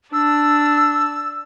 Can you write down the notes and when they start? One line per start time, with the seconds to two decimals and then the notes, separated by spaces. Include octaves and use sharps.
0.13 D4 E6